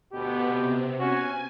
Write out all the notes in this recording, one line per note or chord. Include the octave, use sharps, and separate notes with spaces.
D2 B2 B3 G4
C3
C#4 F#4 G#5